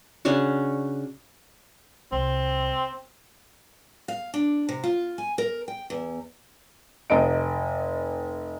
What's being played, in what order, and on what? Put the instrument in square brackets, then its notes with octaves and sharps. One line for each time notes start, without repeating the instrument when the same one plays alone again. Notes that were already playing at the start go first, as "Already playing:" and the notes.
[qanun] C#3 C#4 D4 F#4
[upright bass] C2 [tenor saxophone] C4
[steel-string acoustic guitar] F5
D4
C3
F4
G#5
A#4
G5
E2
[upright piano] F1 D#5 D7